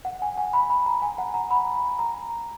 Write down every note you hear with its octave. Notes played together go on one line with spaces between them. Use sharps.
F#5
G#5
G#5
B5
B5
A#5
G#5
F#5
A#5
B5
A#5